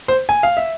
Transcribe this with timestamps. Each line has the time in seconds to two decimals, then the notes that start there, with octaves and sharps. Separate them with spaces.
0.08 C5
0.29 G#5
0.43 F5
0.57 E5